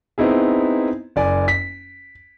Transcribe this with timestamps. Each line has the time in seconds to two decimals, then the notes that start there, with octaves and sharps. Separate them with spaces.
0.18 B3 C4 D#4 E4 G#4
1.16 F#1 D5 G#5
1.48 B6